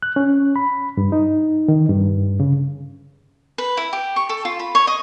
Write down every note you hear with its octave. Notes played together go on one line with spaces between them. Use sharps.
F#6
C#4
B5
G2
D#4
D#3
G2
C#3
B4
E4
G4
C#6
A4
F4
B5
C#5
D#5